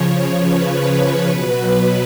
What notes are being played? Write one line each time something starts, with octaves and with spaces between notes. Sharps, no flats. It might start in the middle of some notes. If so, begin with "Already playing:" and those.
Already playing: C#3 F3 C#5
B4
B2 F#3